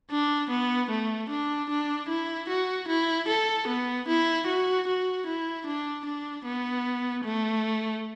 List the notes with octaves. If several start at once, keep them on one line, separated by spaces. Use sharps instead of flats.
D4
B3
A3
D4
D4
E4
F#4
E4
A4
B3
E4
F#4
F#4
E4
D4
D4
B3
A3